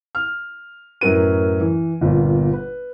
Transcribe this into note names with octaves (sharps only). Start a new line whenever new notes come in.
F6
F#2 A2 C#4 A#4 B4 D#7
E3
G1 A#2 B3
B4